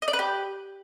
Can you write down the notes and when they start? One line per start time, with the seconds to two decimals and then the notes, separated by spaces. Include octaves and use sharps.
0.02 D#5
0.08 D5
0.13 B4
0.19 G4